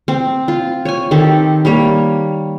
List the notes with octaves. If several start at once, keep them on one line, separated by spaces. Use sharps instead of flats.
C4
F4
C#5 G#5
D#3 C4 G4 A4
G3 A#3 C#5